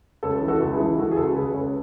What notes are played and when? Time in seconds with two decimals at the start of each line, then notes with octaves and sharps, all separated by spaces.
0.23 C#2 A4 C#5
0.42 E3
0.48 F#4 A4
0.61 C#2
0.73 E4 G#4
0.79 E3
0.98 E3 F#4 A4
1.11 G#4
1.16 C#2 F#4 A4
1.35 C#3 G#4 B4
1.54 C#2 A4 C#5